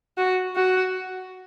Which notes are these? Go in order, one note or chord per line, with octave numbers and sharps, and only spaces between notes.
F#4
F#4